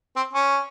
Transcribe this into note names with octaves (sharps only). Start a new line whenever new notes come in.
C4
C#4